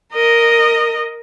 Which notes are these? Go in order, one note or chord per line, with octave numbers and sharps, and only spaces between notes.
A#4 D#5